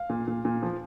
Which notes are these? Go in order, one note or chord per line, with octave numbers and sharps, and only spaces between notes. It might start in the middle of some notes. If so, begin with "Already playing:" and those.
Already playing: F5
A#2
A#2
A#2
F3